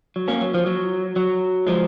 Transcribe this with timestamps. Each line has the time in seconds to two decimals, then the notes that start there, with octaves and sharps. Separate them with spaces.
0.16 F#3
0.28 A#3 C#4
0.41 F#3
0.54 F3
0.66 F#3
1.16 F#3
1.67 F3 G#3